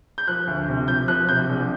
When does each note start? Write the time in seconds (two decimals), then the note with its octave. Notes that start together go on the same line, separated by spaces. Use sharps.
0.18 G6
0.28 F3 F#6
0.48 D2
0.68 C3
0.88 F3 G6
1.08 F3 F#6
1.29 C3 G6
1.49 A#1